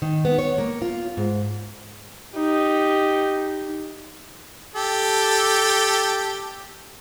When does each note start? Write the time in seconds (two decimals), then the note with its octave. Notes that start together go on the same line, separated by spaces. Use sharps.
0.02 D#3
0.25 B3
0.39 C#5
0.58 A#3
0.82 F4
1.17 G#2
2.36 D#4 G4
4.75 G4 A4